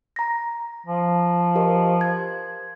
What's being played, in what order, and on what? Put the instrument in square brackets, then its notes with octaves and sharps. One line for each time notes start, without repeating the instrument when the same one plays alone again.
[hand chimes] A#5 A#6
[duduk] F3
[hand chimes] G4 A#4 D#5
G#6